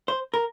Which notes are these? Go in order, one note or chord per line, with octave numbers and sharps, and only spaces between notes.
C5
A#4